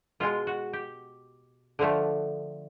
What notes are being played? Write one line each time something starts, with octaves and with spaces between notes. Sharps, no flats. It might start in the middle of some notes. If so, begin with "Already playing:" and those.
B2 G#3 F4
F#4
G4
D3 F3 A3